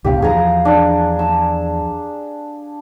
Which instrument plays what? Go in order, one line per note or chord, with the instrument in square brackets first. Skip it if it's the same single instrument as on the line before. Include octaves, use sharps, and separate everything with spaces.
[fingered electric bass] C#2 A2 C3 [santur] G4 F5
[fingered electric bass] E2 F3 [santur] G#4 A#5
[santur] D4
E6